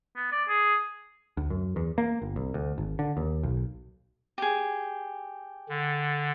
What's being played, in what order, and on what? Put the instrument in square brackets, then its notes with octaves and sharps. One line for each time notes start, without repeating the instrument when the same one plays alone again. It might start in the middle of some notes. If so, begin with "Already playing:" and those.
[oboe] B3
D5
G#4
[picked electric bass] D2
F#2
E2
A#3
G1
C2
D2
G#1
D3
D#2
B1
[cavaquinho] G4 G#4
[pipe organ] D3